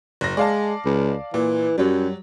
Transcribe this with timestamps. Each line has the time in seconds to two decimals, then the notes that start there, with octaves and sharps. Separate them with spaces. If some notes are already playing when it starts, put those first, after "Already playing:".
0.21 F#1 A#6
0.37 G#3 D5 F5 A5
0.85 C#2
1.34 A#2 E3
1.78 F#2 F#3 G3